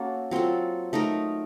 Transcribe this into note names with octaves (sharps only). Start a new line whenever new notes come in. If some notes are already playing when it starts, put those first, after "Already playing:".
Already playing: A#3 C#4 F#4 A4
F#3 C4 F4 A4
A3 D#4 A#4